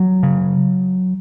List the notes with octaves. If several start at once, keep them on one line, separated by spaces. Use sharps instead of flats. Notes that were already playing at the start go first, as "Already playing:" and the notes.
Already playing: F#3
C#3